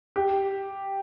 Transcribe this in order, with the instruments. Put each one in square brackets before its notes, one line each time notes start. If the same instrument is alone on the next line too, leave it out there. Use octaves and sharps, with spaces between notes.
[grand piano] G4